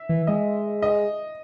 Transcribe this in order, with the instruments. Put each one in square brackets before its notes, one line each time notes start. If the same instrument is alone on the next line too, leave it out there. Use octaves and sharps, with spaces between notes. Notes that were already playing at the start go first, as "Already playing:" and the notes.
Already playing: [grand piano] E5
[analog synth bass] E3
[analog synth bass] G#3 [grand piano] D#5
[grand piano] D#5